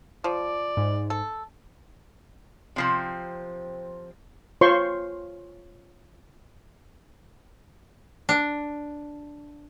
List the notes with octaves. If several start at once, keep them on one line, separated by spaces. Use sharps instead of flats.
F3 D5
G#2
A4
C3 F3 C4
F4 C5 C#5 C6 C#6
D4